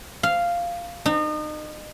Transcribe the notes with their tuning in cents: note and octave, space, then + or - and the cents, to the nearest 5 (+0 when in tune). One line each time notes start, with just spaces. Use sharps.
F5 -5
D#4 -35